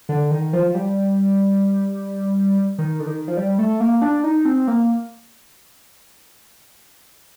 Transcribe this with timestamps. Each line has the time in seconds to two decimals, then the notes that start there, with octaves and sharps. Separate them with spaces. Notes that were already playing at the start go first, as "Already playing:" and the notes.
0.09 D3
0.31 D#3
0.53 F3
0.70 F3
0.75 G3
2.78 D#3
3.00 D3
3.07 D#3
3.28 F3
3.37 G3
3.59 A3
3.80 A#3
4.02 D4
4.24 D#4
4.45 C4
4.67 A#3